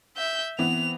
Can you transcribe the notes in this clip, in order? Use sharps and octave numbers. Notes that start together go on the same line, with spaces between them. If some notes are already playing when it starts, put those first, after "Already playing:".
E5 G6
E3 B3 C4 F7